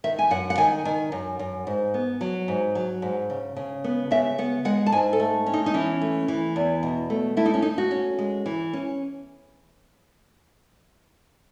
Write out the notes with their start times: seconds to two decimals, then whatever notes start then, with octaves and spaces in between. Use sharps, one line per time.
0.04 D#3 E5
0.19 G#5
0.30 F#2 F#5
0.50 F#5
0.58 D#3 G#5
0.85 D#3 G#5
1.12 F#2
1.39 F#2
1.67 G#2
1.94 B3
2.21 F#3
2.48 G#2
2.75 F#3
3.02 G#2
3.30 C#3
3.56 C#3
3.84 B3
4.11 C#3 E5
4.38 B3 F#5
4.65 G#3 F#5
4.86 A5
4.92 G#2 G#5
5.13 A4
5.20 A3
5.46 C#4
5.54 D#4
5.66 D#4
5.74 E3 C#4
6.02 A3
6.28 E3
6.56 E2
6.83 B2
7.10 A3
7.37 A3 E4
7.46 D#4
7.54 C#4
7.62 A3 D#4
7.78 F#4
7.91 C#4
8.19 G#3
8.46 E3
8.73 C#4